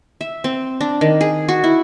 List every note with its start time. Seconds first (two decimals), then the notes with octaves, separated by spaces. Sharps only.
0.21 E5
0.44 C4
0.81 D4
1.01 D#3
1.21 G#4
1.48 F#4
1.64 E4